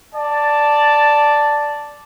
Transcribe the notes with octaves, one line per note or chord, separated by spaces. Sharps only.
D5 A5